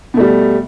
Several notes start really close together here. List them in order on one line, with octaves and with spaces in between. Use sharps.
B2 A3 G3